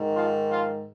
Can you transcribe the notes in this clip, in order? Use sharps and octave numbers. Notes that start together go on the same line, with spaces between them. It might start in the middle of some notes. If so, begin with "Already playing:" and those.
Already playing: G#2 D#3
F3 F4
F3 F4